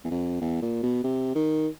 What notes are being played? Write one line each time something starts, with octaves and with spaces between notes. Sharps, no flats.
E2
F2
E2
A#2
B2
C3
D#3